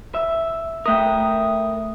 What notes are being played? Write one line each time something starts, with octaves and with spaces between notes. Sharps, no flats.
E5
A3 A#4 E5 G5 D#6